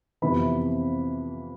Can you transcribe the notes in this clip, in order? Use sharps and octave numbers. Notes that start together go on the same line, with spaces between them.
F2 C3 E3 B3 B5